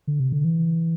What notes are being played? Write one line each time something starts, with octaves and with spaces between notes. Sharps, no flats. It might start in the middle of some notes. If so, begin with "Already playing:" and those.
D3
C3
D3
E3